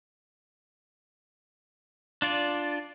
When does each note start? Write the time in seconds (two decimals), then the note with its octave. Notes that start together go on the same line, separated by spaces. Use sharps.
2.22 D4 F4 D5